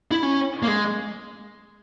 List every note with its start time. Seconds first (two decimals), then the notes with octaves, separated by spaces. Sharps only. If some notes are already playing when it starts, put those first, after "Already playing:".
0.11 E4
0.23 C#4
0.62 A#3
0.68 G#3